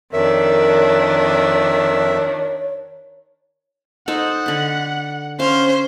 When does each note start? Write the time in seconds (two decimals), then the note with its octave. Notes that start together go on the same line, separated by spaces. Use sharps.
0.13 F2 D#3 D4 A#4 C#5 E5
4.08 D#4 A4 C5 F#5
4.46 D3 B5
5.40 C#4 C5 F5